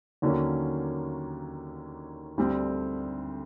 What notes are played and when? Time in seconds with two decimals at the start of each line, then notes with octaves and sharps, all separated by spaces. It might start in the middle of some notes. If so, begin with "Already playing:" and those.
0.22 D#2 D3 F#3 A#3 C#4
2.38 D2 D3 G3 C4